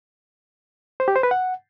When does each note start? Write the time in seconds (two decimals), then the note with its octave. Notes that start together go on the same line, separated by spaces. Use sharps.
1.00 C5
1.08 G4
1.16 C5
1.23 B4
1.31 F#5